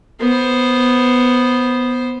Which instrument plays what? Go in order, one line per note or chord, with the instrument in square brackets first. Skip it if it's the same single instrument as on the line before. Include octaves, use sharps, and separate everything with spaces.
[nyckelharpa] B3 C5